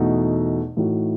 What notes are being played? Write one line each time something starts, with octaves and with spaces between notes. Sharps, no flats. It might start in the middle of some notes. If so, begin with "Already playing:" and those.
Already playing: E2 B2 A3 D#4 A4
A2 E3 A3 D#4 F#4